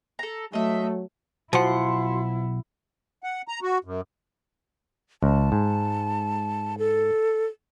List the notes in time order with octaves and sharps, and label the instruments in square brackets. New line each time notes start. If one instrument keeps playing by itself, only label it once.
[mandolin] A4 A#5
[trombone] F#3 [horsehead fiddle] A3 [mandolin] D#5 E5
[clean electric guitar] B1 F#5 [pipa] F3 [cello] E4 [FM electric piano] F#4 C6
[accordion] F#5
A#5
F#4
F#2
[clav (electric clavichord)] C#2 [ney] A5
[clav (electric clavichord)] G#2
[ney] A4